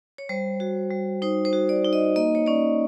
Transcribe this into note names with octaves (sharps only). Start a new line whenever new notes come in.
C#5
G3 C5
F#4
G3
D#4 C5
C5
F#4
D5
D#4
D#5
A#3 D#5
C#5
C#4 D5